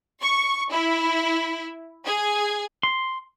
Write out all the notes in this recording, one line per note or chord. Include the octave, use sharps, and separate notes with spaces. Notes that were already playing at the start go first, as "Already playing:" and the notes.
C#6
E4
G#4
C6